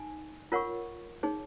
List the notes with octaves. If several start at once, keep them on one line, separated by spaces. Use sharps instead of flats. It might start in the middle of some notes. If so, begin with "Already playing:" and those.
Already playing: D#4 G#5
F4 A#4 C#5 F#5 C#6
D#4 G#4 C#5